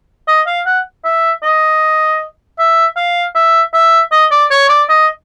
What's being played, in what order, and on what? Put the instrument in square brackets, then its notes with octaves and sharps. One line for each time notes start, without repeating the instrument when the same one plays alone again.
[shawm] D#5
F5
F#5
E5
D#5
E5
F5
E5
E5
D#5
D5
C#5
D5
D#5